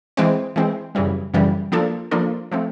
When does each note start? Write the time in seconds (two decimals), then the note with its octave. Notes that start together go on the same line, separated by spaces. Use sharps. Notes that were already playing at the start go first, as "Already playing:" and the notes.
0.17 E3 G#3 C4
0.56 E3 G#3 C4
0.95 F#2 C#3 E3 G3
1.34 F#2 C#3 E3 G3
1.72 F3 A#3 D4 F4 A4
2.11 F3 A#3 D4 F4 A4
2.51 F3 A3 C4